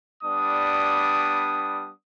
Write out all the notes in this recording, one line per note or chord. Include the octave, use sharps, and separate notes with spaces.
G3 B3 D4 D#6